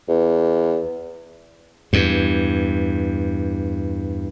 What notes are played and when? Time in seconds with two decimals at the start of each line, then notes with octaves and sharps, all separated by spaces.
0.08 E2
1.93 E2 G2